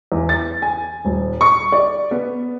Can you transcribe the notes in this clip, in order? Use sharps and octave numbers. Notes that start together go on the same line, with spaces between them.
E2
A6
G#5
D#1
C#6
D5
B3